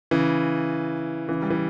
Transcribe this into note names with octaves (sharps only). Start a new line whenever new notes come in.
C#3 E3
C#3 E3
G3
E3